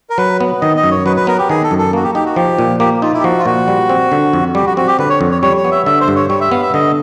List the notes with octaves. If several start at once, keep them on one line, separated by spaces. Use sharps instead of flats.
A#4
F#3 B4
B3
D#3 D#5
D#5
F#2
C#5
F#3 B4
B4
B3 A#4
G4
D#3 G#4
A4
F#2
A4
A#3 F#4
G4
D#4 G4
F#4
F3 G4
A#2
A#3 G4
D#4 F4
E4
G4
F3 F#4
F4
A#2 F#4
G3
C4
D3
F2
G3 G4
F#4
C4 F#4
G4
D3 B4
C#5
F2
C#5
G3 C#5
C#5
B3
E5
D3 E5
C5
G2
C#5
G3 C#5
E5
B3 F5
E5
D3 D#5